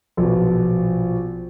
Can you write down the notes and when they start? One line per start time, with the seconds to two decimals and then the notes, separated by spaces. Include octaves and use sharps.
0.17 A#1 B2